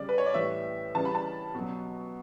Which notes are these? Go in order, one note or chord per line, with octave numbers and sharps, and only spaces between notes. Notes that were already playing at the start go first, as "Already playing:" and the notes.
Already playing: C#3 G3 D5
B4
C#5
D5
A2 E3 G3 E5
C#3 E3 G3 A5
B5
A5
B2 F#3